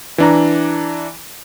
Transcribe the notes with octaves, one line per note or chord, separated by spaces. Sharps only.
E3 D4 A#5